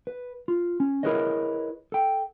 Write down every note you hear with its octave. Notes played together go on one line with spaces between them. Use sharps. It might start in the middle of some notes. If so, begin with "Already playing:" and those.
B4
F4
C#4
E4 G#4 A#4 B4 C#5 D#5
A4 G5